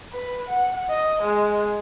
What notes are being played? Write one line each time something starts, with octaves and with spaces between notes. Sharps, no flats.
B4
F#5
D#5
G#3